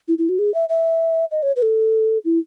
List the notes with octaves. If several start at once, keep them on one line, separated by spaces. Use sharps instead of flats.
E4
E4
F#4
G#4
E5
E5
D#5
C#5
B4
A4
E4